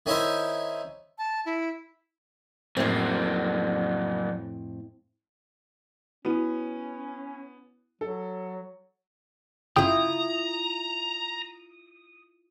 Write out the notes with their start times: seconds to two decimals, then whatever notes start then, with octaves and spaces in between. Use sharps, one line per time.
0.06 D#3 C#4 D#4 E4 C5
1.18 A5
1.46 E4
2.77 F2 A2 F#3 A#3 C4
6.25 B3 C#4 E4 F#4
8.01 F#3 A4
9.76 G1 C#3 E4 F4 G5 A#5 D#6